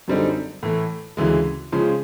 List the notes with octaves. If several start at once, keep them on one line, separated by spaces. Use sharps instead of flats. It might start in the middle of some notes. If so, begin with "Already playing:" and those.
F#2 D3 G3 C4 D#4
A2 E3 A3
D2 C#3 E3 G#3
C#3 F3 G#3